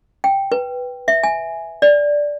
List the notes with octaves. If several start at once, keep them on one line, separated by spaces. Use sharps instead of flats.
G5
B4
E5
G#5
D5